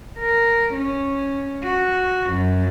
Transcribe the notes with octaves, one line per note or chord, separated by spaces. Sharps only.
A#4
C#4
F#4
F#2